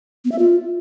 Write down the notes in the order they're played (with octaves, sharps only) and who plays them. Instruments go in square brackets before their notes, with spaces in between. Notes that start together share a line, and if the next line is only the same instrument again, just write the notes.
[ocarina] B3
E5
F4